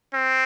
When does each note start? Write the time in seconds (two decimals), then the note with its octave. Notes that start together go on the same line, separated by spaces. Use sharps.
0.14 C4